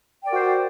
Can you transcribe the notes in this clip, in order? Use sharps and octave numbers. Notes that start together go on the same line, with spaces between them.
F#4 A#4 C5 D5 G5